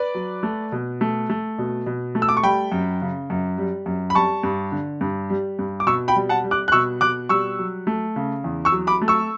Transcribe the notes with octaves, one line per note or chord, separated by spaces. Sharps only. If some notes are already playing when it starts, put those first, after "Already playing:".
Already playing: B4 D5
F#3
A3
B2
A3
A3
B2
B2
A3
E6
D6
C#6
G3 G5 B5
F#2
C#3
F#2
G3
F#2
B5
G3 A5 C#6
G2
D3
G2
G3
G2
D6
B2 C#6 E6
G5 B5
G3
F#5 A5
G3
D6 F#6
F#6
B2 C#6 E6
B2 D6 F#6
G3 C#6 E6
F#3
A3
C#3
E2
C#6 E6
F#3
B5 D6
A3
C#6 E6